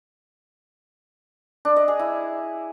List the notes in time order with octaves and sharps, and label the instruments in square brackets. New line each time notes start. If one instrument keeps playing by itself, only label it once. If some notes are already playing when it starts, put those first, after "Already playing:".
[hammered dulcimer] D4
D#5
G#4
E4